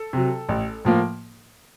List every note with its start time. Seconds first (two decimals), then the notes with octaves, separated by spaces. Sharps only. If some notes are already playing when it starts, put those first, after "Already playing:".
Already playing: A4
0.13 C3 F#3
0.49 A1
0.85 A2 F3 A#3